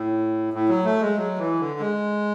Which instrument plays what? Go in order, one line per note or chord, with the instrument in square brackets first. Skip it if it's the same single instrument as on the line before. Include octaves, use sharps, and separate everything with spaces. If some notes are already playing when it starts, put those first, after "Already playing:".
Already playing: [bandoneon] A2
A2
F#3
A3
G#3
F#3
E3
D3
G#3